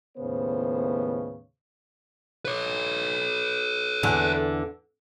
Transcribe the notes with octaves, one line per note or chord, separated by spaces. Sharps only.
D#2 A2 C#3 B3 C5
B4 C#5
E2 D3